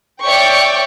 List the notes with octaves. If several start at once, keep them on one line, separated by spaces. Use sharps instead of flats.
C#5 D5 E5 G5 C#6